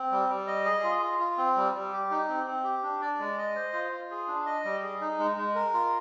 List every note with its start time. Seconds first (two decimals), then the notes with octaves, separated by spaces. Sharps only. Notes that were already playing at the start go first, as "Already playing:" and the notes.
Already playing: C4
0.11 G3
0.29 G3
0.47 D#5
0.66 G#4
0.84 F4
1.02 F4
1.19 F4
1.38 C4
1.56 G3
1.74 G3
1.93 G4
2.11 D#4
2.29 C4
2.46 C4
2.64 G4
2.83 D4
3.02 D5
3.19 G#3
3.38 D#5
3.56 C5
3.73 F4
3.92 F4
4.11 G#4
4.28 D4
4.46 D#5
4.65 G3
4.83 G#4
5.01 D#4
5.19 G#3
5.37 G#3
5.55 A#4
5.73 F4